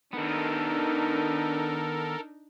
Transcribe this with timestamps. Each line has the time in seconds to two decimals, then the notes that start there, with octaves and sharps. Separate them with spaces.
0.14 D#3 B3 D4 D#4 A4 A#4